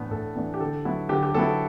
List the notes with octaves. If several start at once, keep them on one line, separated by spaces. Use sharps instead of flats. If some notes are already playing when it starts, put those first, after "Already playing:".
Already playing: A2 E3 B3 D4
A2 A4
E3 B3 D4
G4
D3 A4
F#3 B3 E4
D3 G4
G4
F#3 B3 E4 A4